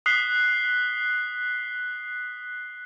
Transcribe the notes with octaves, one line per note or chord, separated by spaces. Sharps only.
D#6 F#6 B6 C7 G7